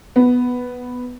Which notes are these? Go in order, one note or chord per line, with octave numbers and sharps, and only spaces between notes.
B3